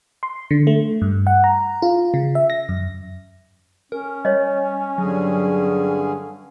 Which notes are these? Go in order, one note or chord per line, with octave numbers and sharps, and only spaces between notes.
C6
D3
A3
G2
F#5
A#5
F4
C#3
E5
A#6
F#2
C#4 A#4
G3 C#5 D#5
G2 D3 F#3 G#4